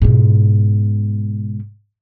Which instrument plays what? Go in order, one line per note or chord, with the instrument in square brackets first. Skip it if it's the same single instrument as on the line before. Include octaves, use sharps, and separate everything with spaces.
[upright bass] G#2 B2